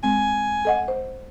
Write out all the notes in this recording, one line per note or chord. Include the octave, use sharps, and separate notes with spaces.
G#3 C4 G#5
A4 D#5 F#5
C5